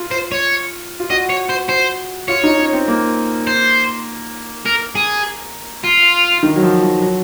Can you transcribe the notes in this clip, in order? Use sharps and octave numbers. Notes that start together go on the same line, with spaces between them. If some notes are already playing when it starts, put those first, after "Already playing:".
Already playing: F4
C5
C#5
F4
F#4 D#5
C#5
C5
C5
F4 C#5
D#4
C#4
C4
A#3
C5
A#4
G#4
F4
D#3
F#3
F3
F3
F#3